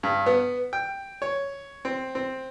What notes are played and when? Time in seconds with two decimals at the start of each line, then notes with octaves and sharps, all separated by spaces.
0.03 G2
0.26 B3
0.73 G5
1.22 C#5
1.85 C4
2.15 C4